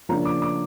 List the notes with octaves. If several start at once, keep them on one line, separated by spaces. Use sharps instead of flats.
C#3 F3 A#3 D4 A#5
D6
D6